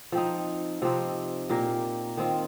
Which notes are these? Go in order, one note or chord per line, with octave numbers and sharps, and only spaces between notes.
F3 C4 D#4
C3 F3 C4 D#4
A#2 A#3 G4 A#4
D#3 C4 F4